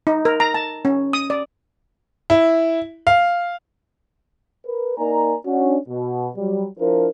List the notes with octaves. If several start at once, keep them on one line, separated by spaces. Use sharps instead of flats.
D#4
A#4
A#5
A5
C#4
D#6
D5
E4
F5
A#4 B4
A#3 D#4 A#4 D5 G#5 A#5
C#4 D4 F#4
B2
F#3 G3
F3 D4 E4 A#4